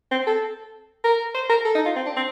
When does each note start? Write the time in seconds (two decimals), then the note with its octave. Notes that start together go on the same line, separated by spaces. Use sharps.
0.11 C4
0.27 A4
1.04 A#4
1.35 C5
1.49 A#4
1.65 A4
1.75 D#4
1.85 F4
1.96 C4
2.06 D4
2.16 C4